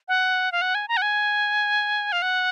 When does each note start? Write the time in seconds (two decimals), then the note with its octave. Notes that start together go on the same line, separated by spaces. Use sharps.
0.08 F#5
0.52 F5
0.62 F#5
0.75 G#5
0.88 A#5
0.97 F#5
1.02 G#5
2.12 F5
2.22 F#5